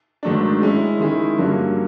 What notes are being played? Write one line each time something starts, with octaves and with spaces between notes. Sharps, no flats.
G#2 D#3 F#3 A3 D4
G#3 C#4 E4
D#3 G#3 C#4 E4 G#4
G2 D3 F#3 A#3 C#4